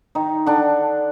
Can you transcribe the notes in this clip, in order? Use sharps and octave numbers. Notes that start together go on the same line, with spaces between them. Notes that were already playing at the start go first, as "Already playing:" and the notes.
D#3 D#4
D3 D4